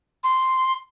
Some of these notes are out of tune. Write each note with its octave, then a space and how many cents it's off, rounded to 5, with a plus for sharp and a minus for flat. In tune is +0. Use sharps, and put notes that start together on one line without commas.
C6 -5